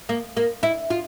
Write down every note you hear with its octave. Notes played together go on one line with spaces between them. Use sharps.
A#3
A#3
E4
F4